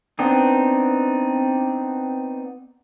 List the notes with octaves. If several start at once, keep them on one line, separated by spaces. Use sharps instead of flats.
B3 C4 D4 D#4